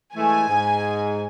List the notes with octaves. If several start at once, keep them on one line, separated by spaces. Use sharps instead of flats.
E3 G#3 A3 G#5
G#2